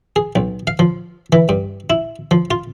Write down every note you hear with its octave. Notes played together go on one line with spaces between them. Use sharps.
G#4
B1
F5
F3
E3
G2
E4
F3
F4